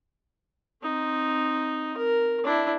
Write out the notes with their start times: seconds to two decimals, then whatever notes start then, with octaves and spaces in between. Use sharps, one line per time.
0.83 C4 D#4
1.97 A#4
2.44 D4 E4